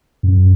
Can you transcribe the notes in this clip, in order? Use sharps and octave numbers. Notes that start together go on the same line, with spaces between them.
F#2